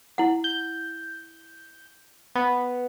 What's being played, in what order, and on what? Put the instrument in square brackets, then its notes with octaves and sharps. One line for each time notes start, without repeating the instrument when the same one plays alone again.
[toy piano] E4 F#5
[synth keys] G6
B3